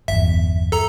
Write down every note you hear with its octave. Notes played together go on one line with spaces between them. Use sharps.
G1 E2 E5
A4 A#5